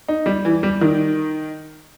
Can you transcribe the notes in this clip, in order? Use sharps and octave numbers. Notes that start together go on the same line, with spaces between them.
D#4
G3
E3
G3
D#3